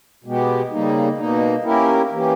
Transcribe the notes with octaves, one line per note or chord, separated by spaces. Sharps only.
B2 G#3 B3 G4
C#3 G3 A#3 D#4
B2 A#3 D#4
A#3 C#4 E4 G4 A#4
E3 A#3 C#4 G4